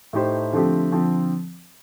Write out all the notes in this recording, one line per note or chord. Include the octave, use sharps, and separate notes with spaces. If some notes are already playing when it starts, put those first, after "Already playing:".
A2 A3 D#4 G4 C5
D3 F3 A3 C4 G4
D3 F3 C4